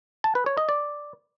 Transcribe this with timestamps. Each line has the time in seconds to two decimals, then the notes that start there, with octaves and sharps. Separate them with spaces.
0.24 A5
0.35 B4
0.46 C#5
0.57 D#5
0.69 D5